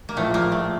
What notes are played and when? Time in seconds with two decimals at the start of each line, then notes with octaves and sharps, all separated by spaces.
0.09 A#3
0.17 A#1 A2 F3 A3
0.34 A#3
0.52 A3